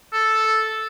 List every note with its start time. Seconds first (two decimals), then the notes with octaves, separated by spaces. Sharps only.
0.13 A4